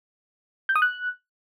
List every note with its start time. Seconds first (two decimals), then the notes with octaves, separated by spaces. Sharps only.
0.69 G6
0.76 D#6
0.82 F#6